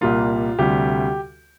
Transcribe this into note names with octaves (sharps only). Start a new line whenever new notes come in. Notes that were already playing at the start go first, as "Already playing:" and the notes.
C2 A#2 G3 A#3 F4
D2 C3 G3 G4